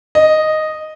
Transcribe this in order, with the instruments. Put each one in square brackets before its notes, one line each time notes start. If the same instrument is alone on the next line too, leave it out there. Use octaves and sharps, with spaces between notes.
[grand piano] D#5